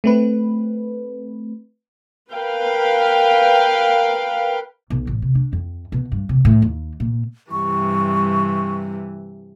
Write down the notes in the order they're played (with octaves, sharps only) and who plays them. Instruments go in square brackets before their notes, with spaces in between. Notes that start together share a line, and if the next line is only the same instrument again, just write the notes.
[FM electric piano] A3 C4 B4
[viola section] A#4 B4 F5 G5
[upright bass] B1
A1
C3
D4
F2
B2
G2
C3
A2
D#2
A#2
[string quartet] G2 C3 E3 [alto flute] C#6